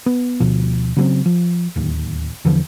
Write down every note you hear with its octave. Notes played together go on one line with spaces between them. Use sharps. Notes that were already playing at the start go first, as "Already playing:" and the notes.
B3
D2 B2 F3
C#3 F#3 A#3 C4
F3
D1 D#2
E2 D3 E3 F3